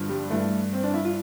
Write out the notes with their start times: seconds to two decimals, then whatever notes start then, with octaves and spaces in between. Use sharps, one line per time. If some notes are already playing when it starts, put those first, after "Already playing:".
Already playing: G2 D3 F3
0.09 G3
0.30 G2 E3 A3
0.73 C4
0.83 D4
0.94 E4
1.05 F4